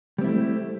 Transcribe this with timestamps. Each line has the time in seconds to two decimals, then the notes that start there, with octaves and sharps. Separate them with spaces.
0.18 G3
0.21 C4
0.24 E4
0.27 A3